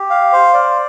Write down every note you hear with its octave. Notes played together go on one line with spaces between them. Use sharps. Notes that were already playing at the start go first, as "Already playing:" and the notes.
Already playing: G4
F5
C5
D5